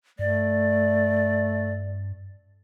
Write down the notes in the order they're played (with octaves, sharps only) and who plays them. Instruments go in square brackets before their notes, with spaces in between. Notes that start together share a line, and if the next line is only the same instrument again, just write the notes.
[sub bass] G2 [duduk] A3 [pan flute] D5